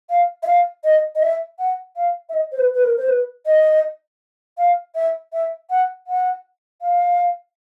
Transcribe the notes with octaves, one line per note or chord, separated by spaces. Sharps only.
F5
E5
F5
D#5
D#5
E5
F#5
F5
E5
D#5
C5
B4
B4
A#4
C5
B4
D#5
F5
E5
E5
F#5
F#5
F5